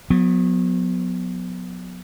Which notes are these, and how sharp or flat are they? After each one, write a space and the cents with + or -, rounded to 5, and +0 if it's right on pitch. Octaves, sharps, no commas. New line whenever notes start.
F#3 -35 B3 +0